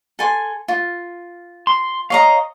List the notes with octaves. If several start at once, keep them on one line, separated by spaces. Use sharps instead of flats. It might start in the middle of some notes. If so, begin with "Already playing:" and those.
A4 G#5 C6
F4
C6
C#5 D#5 F5 A#5